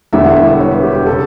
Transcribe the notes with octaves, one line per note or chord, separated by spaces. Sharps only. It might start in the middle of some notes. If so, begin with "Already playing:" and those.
E1 E2 D3 G3 E5
F#5
E5
E5
C#5
B4
G4
G4
C#3 A4